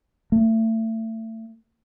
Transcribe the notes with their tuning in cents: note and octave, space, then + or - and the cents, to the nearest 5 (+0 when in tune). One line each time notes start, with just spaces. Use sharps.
A3 +30